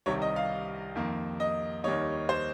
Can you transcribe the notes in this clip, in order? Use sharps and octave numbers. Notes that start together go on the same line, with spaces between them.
C2 C3 D#3 G3 C#5
D#5
F5
F2 D#3 A#3
D#5
D#2 D#3 G3 A#3 D#4 C#5
C5